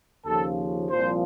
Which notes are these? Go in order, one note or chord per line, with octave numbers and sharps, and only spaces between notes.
D#2 C#3 F3 A4
C2 A#2 F3 C5